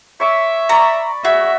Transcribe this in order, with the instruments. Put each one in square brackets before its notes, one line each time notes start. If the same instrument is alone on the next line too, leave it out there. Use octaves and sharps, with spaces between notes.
[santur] C#5 C#6 D6 [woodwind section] E5
[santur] D5 B5 C#6 [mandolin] A#5
[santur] F#4 [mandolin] G#4 [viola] E5